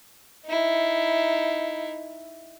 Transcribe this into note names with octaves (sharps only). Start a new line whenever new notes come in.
D#4 E4